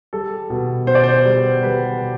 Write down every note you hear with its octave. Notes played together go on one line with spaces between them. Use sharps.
G3 A4
B2
B2 C5
D5
C5
G3
G3 B4
B2